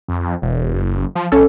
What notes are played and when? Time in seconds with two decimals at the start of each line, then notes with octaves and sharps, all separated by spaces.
0.08 F2
0.42 E1
0.74 F#1
1.15 F3
1.32 B1 C#4 A4